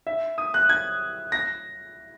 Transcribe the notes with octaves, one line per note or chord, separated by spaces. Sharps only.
E5
D#6
F#6
G#6
A#6